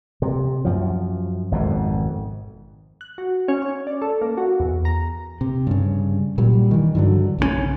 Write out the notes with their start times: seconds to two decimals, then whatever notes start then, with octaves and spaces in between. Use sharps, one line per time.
0.22 C3
0.65 F#2 F3
1.51 G#1 F2 B2
3.01 F#6
3.18 F#4
3.48 C#4
3.62 C#5
3.87 D5
4.02 A4
4.22 A#3
4.37 F#4
4.60 E2
4.85 A#5
5.41 C3
5.67 G2 C#3
6.38 A#2 F#3 G3
6.71 D#3 E3
6.95 G2 D3 F#3
7.39 B1 C#3 G3 C#4